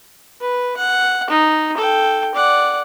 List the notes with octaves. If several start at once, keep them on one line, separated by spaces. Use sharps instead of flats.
B4
F#5
D#4
A4 G5
D5 F#5